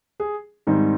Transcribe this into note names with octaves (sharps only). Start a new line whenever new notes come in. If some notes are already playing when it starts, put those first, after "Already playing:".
G#4
G#2 D#3 G3 C4 D#4